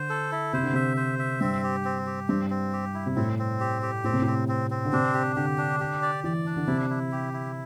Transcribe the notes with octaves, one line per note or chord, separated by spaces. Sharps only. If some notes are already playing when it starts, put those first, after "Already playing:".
Already playing: D3 C5
A4
E4
C3 C5
D3
C3 E5
C5
E5
G2 C4
G4
C4
G4
G2 C4
C4
G4
E4
C3
A2 C4
C4
G4
G4
A2 C4
C3
A2 C4
C4
C4
D3
C3 D4
G4
D3 G4
D4
G4
D5
E3 D5
D4
D3
C3 E4
E4
G4
E4